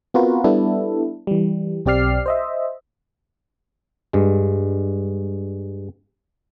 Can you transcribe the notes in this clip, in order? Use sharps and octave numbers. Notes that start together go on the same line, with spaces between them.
B3 C4 F4 F#4 A#4 B4
G3 B3 D4 E4 A4
E3 G3
B1 C4 G4 D5 F6 C7
C5 D#5 E5
G2 G#3